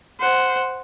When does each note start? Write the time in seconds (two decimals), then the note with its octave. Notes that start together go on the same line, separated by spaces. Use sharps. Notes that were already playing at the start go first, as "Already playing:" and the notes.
0.20 C5 F#5